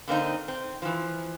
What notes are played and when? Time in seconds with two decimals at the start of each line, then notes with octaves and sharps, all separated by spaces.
0.08 D3 A#3 C4 D#4
0.48 C4
0.82 E3 F3